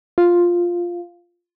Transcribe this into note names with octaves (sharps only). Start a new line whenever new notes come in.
F4